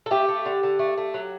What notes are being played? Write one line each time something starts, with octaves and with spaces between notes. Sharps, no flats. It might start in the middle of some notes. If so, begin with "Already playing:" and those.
A4
A3 G4
A3
D3
D3
A3
A3
F#3